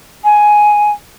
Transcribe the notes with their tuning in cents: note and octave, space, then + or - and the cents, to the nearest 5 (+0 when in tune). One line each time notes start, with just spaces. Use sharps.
G#5 +5